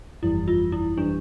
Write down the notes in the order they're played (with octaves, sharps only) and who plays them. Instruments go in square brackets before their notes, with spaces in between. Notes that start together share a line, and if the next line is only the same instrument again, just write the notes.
[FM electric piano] G1 F2 E3 G3 [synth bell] E4
[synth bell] F4
E4
[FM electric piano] E3 G3 [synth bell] D4